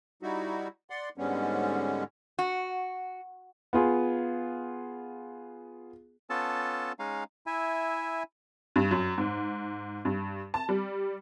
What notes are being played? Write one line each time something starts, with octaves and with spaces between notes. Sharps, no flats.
G3 D#4 E4 F#4
D5 F#5 C6
G#2 D3 G3 G#3 B3 C#4
F#4
B3 F4 G#4
B3 C#4 F4 A4 A5
G#3 C#4 D#4 F5
E4 E5 G#5
G2
F#2
G#2
G2
A5
G3